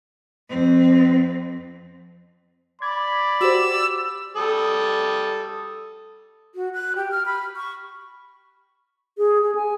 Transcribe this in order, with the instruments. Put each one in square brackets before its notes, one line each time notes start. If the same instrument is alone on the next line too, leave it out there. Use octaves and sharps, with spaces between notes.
[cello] F2 C4
[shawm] D5 [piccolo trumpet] B5 [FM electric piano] G#6
[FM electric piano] F#4 G4 C5 [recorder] E6
[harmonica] G3 A4 D#6
[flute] F#4
F#6
G4
F6
B5
C#6
[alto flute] G#4
G#4
G#5